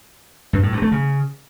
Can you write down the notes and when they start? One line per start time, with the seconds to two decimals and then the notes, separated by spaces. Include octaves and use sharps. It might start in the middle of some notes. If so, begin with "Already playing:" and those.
0.53 G2
0.63 A2
0.72 G2
0.82 A3
0.92 C#3